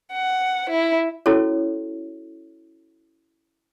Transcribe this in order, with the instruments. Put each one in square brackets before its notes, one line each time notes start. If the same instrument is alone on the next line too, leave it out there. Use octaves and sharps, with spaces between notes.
[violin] F#5
E4
[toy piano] C#4 E4 F#4 A4 C#5